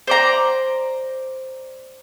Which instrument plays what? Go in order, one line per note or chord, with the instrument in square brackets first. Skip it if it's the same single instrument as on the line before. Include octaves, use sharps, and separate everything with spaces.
[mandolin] C5 D5 A#5